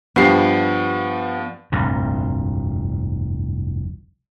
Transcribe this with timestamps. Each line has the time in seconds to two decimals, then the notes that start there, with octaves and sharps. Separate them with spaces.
0.16 G2 F3 B3 G4 C7
1.72 F1 C2 G2 A#2